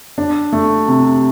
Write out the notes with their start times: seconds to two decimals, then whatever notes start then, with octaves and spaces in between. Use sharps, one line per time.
0.18 D4
0.52 A3
0.88 C3